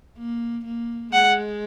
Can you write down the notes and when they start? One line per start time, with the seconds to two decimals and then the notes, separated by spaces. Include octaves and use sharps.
0.18 A#3
0.64 A#3
1.12 G#3 F#5